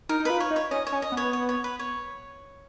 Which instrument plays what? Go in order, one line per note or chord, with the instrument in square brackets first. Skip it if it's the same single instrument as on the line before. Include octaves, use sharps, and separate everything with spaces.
[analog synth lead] D#4 [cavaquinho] A#4
[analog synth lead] D#4
[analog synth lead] F4 [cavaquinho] B4
[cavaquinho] C#5
[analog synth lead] D#4
[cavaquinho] C#5
[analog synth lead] C#4 [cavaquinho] D#5
[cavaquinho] C#5
[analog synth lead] C#4
[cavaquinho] D#5
[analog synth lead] B3
[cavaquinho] C#5
C#5
C#5
B4
C#5